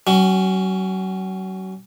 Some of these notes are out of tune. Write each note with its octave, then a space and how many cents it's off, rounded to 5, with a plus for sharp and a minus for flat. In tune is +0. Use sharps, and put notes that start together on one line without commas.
F#3 +30 C#4 +0